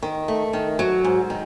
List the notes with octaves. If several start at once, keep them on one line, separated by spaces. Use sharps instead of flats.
D#3
A3
D#3
F#3
G#2
D#3